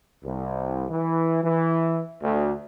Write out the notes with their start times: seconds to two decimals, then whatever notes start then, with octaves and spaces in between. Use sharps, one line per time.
0.24 C2
0.89 E3
1.42 E3
2.22 D2